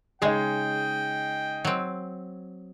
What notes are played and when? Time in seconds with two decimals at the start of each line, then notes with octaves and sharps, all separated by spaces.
0.22 C#3 G#3 D#4 G#4 G5
1.65 F#3 C4